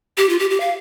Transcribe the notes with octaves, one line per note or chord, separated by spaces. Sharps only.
G4
F4
G4
G4
F5